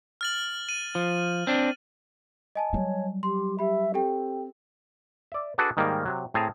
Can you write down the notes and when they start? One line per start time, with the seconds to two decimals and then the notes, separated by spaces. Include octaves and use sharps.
0.21 F6 A6 F#7
0.69 D#7
0.95 F3
1.47 C4 D4
2.56 D#5 G#5 A5
2.73 F#3 G3 C#5
3.23 G4 C6
3.59 G4 E5 B5
3.94 C4 G4 A4 G5
5.32 D5 E5
5.58 D4 F#4 G#4 A4 B4 D5
5.77 G#2 D#3 G3 A#3
6.05 C3 F#3
6.34 A2 C4 G#4 A5 A#5